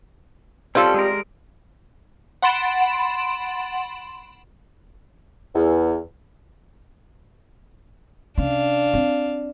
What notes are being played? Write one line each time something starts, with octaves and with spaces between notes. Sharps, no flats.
G3 C4 C#4 F4 A4
G#3 A#4
F#5 B5 C6 A6 D7 E7
E2
C3 C#4 D4 F5
C4